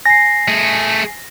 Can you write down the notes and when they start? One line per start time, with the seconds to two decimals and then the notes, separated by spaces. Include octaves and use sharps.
0.06 G#5 A#6 C7
0.48 A3 G#4